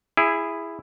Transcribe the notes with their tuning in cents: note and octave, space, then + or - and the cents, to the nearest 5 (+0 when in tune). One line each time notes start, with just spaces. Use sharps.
E4 +5 G#4 -15